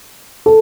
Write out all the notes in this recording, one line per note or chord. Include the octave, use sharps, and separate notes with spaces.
A4